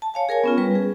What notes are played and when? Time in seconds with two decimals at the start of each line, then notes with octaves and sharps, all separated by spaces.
0.02 A5
0.14 C#5 F5 G#5
0.29 G#4 A#4 C#5 G#5
0.44 B3 C#4 F4
0.58 G3 B4
0.75 G#4